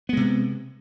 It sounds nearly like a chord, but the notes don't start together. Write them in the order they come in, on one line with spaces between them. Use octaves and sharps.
B3 G#3 C3